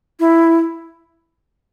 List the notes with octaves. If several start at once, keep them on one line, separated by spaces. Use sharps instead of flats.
E4